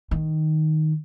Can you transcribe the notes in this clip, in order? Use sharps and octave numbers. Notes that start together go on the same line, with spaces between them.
D#3